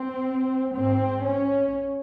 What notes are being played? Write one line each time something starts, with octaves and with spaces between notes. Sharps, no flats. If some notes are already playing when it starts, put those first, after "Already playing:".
Already playing: C4
G#2 C4
C#4